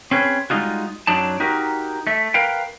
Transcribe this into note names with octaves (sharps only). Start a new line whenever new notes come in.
C4 C#4 G#4 B4
G3 G#3 D#4 F4 F#4
F#2 F#3 D4 D#4 A5
D#4 F#4 G4 A#4
A3 E5
A#4 B4 F5 G5